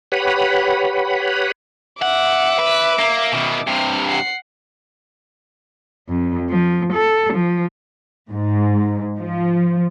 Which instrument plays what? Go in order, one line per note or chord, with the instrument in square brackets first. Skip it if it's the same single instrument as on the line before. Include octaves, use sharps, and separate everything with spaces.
[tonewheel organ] G4 B4 C#5 F#5 B5
[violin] E5 D6 [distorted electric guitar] F#5
[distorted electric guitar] B4
A#3
B2 D#3
[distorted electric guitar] G2 C3 [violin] F6
[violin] F#5 C7
[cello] F2
F3
A4
F3
[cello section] G#2
F3